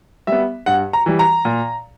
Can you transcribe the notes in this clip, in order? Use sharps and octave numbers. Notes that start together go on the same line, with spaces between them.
G3 B3 E5
G2 F#5
A#5
E3 G3
A#5
A#2